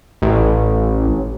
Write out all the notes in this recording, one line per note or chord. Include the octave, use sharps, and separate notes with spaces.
A1